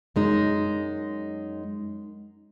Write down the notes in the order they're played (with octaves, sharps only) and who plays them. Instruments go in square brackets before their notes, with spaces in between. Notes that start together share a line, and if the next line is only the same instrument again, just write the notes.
[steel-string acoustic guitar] F#2 G#3 D#4